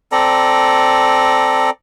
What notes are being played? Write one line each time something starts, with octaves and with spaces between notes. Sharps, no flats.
C4 A4 D5 A#5